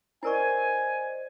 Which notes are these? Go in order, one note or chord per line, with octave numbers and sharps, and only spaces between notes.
E4 A#4 C5 D5 D#5 G#5 C#6